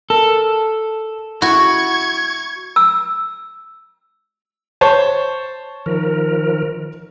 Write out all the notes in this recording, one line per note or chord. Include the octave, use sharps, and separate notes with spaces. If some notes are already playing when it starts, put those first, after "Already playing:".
A4 A#4
E4 F#4 C#6 G#6
E6
C5 C#5 A5
D#3 F3 A#4